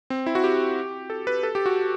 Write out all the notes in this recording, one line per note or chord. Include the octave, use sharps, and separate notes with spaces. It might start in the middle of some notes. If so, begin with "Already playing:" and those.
C4
E4
F#4
G4
A4
B4
A4
G4
F#4